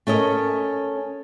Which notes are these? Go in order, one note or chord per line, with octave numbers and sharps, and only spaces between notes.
A3 C#4 A#4 D#5